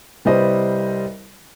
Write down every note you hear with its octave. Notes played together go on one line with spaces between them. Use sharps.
C2 G3 B4 C5 D#5 E5